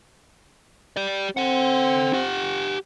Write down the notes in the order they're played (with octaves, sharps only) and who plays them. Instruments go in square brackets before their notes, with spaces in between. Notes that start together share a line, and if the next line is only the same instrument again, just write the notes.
[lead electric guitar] G4 D5
[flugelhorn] C4 [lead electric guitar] A4 F#5
[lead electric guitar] G4 F#5